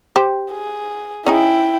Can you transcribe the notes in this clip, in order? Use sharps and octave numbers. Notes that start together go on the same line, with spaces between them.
G4 C5
G#4
C#4 D#4 E4 G#4 G5